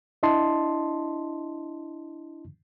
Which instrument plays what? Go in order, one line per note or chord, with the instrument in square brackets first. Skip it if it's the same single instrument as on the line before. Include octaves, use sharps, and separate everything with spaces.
[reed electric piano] D4 E4 D#5 A5 C6